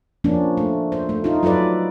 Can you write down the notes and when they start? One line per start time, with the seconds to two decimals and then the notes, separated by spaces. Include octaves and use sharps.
0.24 F3 A#3 C#4 D4
0.57 A3
0.92 C5
1.09 A3
1.24 D#4 F4
1.43 F#3 F4 A4 B4 D5